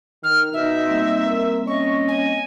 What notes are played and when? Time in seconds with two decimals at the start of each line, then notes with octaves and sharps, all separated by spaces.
0.23 D#3 F6
0.53 B2 D#4 E5
0.86 G3 A#3 C4
1.26 A#4
1.67 C#4 D#5 C#6
2.08 G#5